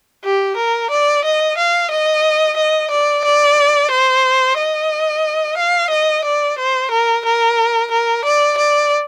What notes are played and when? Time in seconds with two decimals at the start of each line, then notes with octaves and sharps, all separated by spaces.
0.25 G4
0.57 A#4
0.90 D5
1.25 D#5
1.58 F5
1.91 D#5
2.57 D#5
2.91 D5
3.25 D5
3.91 C5
4.57 D#5
5.57 F5
5.91 D#5
6.25 D5
6.59 C5
6.91 A#4
7.25 A#4
7.91 A#4
8.25 D5
8.58 D5